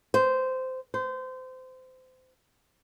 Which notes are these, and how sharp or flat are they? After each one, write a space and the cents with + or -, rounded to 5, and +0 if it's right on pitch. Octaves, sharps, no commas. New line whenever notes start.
C5 -15
C5 -25